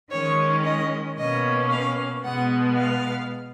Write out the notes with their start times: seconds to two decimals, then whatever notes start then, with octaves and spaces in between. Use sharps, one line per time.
0.11 D#3 G#3 C#4 C#5
0.64 D#5
1.17 B2 A#3 C#4 D#5
1.70 F5
2.24 B2 G#3 B3 F#5
2.77 F5